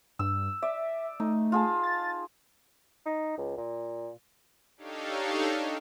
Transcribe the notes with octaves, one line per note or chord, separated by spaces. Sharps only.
G2 E6
D5 E5
A3 D#4
F4 G#4 A5
A6
D#4
C#2
A#2
D4 D#4 G4 A4 C#5 F5